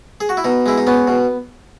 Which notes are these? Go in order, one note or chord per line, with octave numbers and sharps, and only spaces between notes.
G#4
F#4
E4
B2 D#4
G#3 E4
D#4
B3 C#4
B2